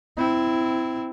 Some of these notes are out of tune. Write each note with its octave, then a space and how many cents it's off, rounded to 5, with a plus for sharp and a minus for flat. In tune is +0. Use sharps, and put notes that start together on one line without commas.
C4 -15 E4 +0